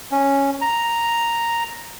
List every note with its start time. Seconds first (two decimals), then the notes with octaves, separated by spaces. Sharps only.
0.12 C#4
0.61 A#5